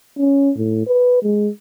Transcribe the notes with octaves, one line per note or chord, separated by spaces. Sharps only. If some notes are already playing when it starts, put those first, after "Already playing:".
C#4
A2
B4
G#3